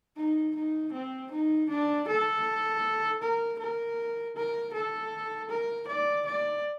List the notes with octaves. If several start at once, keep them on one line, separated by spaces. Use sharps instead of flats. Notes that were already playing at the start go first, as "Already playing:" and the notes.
D#4
D#4
C4
D#4
D4
A4
A#4
A#4
A#4
A4
A#4
D5
D5